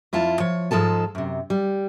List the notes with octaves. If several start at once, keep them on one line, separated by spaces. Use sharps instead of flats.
F2 E4 F4 A5
F3 C#5
G#2 F3 G#3 A4 A5
F#2 C3
G3